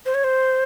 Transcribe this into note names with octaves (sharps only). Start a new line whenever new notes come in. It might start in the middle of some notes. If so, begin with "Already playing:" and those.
C5
C#5
C5